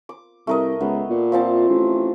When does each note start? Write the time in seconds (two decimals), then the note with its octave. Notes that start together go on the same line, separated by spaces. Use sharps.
0.09 D6
0.47 C2 A3 A#4 D#5
0.81 C#2 B3
1.10 A#2
1.32 F3 C4 A5
1.69 A1